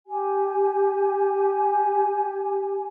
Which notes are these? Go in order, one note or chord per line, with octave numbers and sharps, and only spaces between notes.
G4 G#5